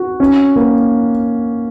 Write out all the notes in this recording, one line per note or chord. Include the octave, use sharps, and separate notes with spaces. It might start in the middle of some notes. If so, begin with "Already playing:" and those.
Already playing: F#4
C#4
A#3